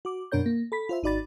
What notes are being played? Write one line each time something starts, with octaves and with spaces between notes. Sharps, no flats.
F#4 D6
F#2 B2 D4 A#4 C#5 G6
A#3
A4 B5 B6
F4 C5 E5
G#1 D#4 F#4 D5 B5 A6